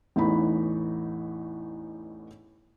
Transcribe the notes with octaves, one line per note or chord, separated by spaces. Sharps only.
A1 E2 A2 E3 D#4 B5